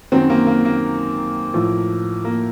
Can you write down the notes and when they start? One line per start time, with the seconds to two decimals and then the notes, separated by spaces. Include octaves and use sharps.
0.12 F#2 D#3 F#3 C4
0.30 A#3
0.47 A#3
0.65 A#3
1.54 A2 F3
2.24 A#3